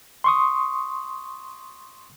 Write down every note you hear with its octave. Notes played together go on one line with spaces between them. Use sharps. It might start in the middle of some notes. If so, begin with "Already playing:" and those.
C6 C#6 D#6